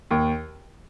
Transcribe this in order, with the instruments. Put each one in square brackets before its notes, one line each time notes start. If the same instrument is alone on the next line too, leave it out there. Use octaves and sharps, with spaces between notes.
[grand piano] D#2